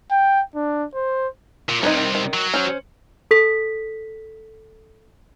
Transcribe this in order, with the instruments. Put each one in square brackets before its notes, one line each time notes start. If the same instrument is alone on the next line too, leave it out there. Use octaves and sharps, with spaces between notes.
[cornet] G5
D4
C5
[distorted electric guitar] A#2
[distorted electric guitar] C2 C3 [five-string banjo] D#4 B4 C#5
[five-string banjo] D#3
D#3
[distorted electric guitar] F#3
[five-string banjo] C#4 C5
[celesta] A4 B6